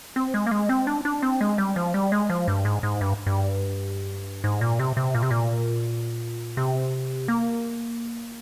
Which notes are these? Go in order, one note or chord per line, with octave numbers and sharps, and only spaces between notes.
C4
G#3
A#3
G#3
C4
D4
D4
C4
G#3
G3
F3
G3
G#3
F3
G2
G#2
G#2
G2
G2
G#2
A#2
C3
C3
A#2
C3
A#2
C3
A#3